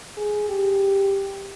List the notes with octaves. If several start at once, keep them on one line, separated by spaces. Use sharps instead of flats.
G#4
G4